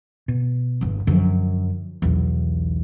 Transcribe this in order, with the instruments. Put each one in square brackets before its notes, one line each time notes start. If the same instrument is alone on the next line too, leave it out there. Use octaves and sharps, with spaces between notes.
[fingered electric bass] B2
[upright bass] G1 E2
[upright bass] F#2 [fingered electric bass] D3 F3
[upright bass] B1 E2